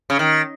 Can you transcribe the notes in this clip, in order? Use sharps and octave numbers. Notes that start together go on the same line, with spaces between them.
C#3
D#3